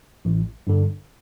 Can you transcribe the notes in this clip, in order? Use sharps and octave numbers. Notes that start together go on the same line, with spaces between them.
A1
G2 D3